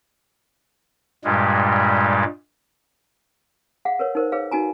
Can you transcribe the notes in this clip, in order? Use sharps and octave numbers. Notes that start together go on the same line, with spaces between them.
G2 A#2 G3 G#3
G#4 F5 F#5
A#4 B4 C#5
D#4 A#4 C5
G#4 B4 C#5 F5
D#4 F#4 G#5 A#5